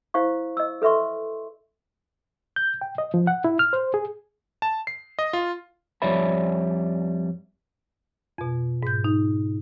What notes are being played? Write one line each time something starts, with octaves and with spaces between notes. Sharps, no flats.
E4 C5 F5 C#6
D#5 E6
A4 B4 E5 C6 C#6
G6
G5
D#5
F3
F#5
E4
F6
C5
G#4
A5
C7
D#5
F4
F2 G3 C#5 D5 E5 B5
F2 B2
G#2 G6
D#4